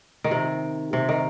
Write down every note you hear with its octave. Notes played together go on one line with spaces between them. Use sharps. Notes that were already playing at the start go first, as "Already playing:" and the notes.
D#3
C3
C3
D#3